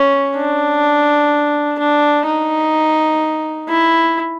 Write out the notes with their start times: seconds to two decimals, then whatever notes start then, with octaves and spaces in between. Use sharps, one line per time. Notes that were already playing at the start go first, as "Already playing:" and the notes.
Already playing: C#4
0.36 D4
1.79 D4
2.27 D#4
3.69 E4